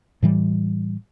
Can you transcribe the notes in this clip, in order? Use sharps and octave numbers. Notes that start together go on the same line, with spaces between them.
A2 E3 G3